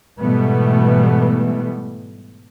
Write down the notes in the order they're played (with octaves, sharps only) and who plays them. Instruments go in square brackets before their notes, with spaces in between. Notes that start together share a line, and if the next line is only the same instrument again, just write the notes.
[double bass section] G#2 B2 E3 G3 A3 B3